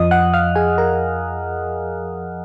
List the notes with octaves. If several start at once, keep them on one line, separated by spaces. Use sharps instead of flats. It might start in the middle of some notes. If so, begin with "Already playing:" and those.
Already playing: F2 F3 D#5 D#6
F#5 F#6
F5 F6
G#4 G#5
A#4 A#5